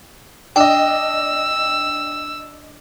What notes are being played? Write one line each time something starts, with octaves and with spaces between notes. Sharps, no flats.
D4 D#5 G5 E6